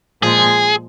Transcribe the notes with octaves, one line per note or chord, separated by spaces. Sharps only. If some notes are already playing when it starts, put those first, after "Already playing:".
A#2 F3 G#3 G#4